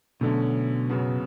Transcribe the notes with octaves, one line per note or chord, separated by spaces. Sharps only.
B2 D3 F#3 A3 C#4
F#2 C#3 F#3 B3